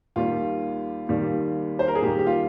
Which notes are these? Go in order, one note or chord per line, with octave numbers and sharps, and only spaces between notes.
D#2 D#3 G3 F4
D#2 D#3 G3
C5
A#4
G#4
D#2 D#3 G3 G4
G4
F4